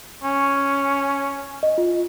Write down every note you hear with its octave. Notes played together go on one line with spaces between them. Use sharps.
C#4
D#5
F4